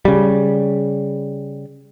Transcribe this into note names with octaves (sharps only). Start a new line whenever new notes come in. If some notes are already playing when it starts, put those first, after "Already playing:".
C#3 G3